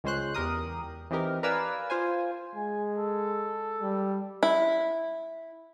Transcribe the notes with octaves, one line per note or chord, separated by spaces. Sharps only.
C#2 G#3 C#4 C5 C6 F#6
E2 G4 A#4 D#6
E3 C4 D#4 G4 A#4
A#4 B4 D5 F5 G#5 E6
F4 C5 G#5
G#3 G#5
A4
G3
E4